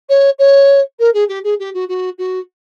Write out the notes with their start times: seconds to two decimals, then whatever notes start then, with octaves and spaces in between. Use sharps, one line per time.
0.09 C#5
0.39 C#5
0.99 A#4
1.14 G#4
1.28 G4
1.44 G#4
1.59 G4
1.74 F#4
1.88 F#4
2.18 F#4